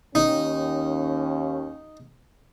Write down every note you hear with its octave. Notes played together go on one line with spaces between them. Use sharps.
D#2 C#4 D#4